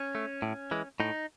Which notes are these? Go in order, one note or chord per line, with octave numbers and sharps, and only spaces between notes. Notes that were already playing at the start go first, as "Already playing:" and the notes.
Already playing: C#4
A3
A2
E3 G#3
A2 D#4